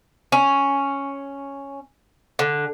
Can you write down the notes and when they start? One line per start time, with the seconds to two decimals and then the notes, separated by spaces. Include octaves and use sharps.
0.32 C#4
2.39 D3